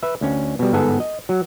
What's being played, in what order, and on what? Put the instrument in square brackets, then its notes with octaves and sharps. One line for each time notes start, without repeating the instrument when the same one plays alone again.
[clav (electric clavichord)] B4 E5
D2 C#4
B2 G3
G1 G#2 B3 G#4 A4 G#5
D#5
F#3